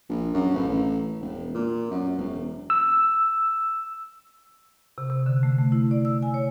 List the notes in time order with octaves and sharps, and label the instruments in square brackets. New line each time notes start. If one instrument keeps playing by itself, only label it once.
[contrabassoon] A#1
F#2
A1
A1
E1
A#2
F#2
E1
[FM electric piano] E6
[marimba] C3
C3
D3
A3
A3
E4
D5
E6
G#5
C#5